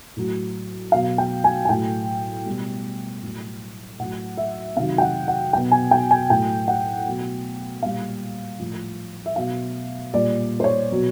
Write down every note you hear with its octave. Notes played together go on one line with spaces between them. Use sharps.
A2 F#3
B2 F#3 F5
G5
G#5
G#5
A2 F#3 G5
B2 G3
A2 F#3
A2 F#3 F#5
E5
C3 D#3 F#3 F5
G5
F#5
F#5
B2 F#3 G5
G#5
G5
G#5
A2 F#3 G5
F#5
B2 F#3
A#2 G3 F5
A2 F3
E5
B2 F#3 F5
A#2 G3 D5
C5
C#5
B2 F#3